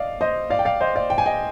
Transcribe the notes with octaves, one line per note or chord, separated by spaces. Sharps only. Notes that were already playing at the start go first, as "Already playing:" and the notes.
Already playing: D5 D#5 F5
C5 D#5
D5 F5
G5
D5 F5
C5 D#5
D5 F5
G5
G#5
D#5 G5